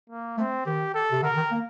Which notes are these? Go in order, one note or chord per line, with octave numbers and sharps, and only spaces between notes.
A#3
A3 C4
D#3 G4
A4
C3
D3 A#4
D#3
A#3